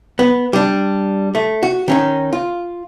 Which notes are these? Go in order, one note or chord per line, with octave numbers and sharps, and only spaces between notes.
B3
G3 D4
A3
F#4
D#3 C#4 D#4
F4